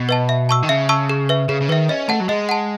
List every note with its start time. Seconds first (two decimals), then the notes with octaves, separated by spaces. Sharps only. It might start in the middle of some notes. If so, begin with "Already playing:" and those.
Already playing: B2
0.09 B4 D#5 A5
0.29 E5
0.49 A5 C#6 E6
0.63 D#3
0.69 C#3 E5
0.89 A5 C#6 E6
1.10 G#4
1.29 B4 E5
1.49 C#3 G#4
1.61 C#3
1.68 D#3 B4 E5
1.89 C#4 D#5
2.09 A3 F#5 A5
2.20 F#3
2.29 G#3 D#5
2.49 F#5 A5